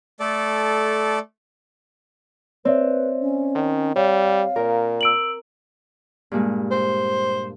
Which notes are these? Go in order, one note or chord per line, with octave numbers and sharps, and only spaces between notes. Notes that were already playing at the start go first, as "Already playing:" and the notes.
A3 A4 D5
C4 B4 C#5 D5 E5
C#4
D#3
G3 C#5 F5
A#2 A#4
E6 D7 F#7
G2 A#2 G#3
C5